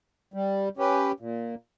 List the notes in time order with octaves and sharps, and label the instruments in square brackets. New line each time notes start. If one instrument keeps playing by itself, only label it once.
[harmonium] G3
C#4 G4 B4
A#2